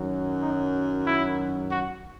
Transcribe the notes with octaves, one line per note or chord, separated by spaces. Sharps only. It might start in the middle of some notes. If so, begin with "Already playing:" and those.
Already playing: F#2 D#3 F#3
D#4
E4
F#4